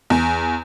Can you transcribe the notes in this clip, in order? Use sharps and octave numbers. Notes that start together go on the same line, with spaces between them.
E2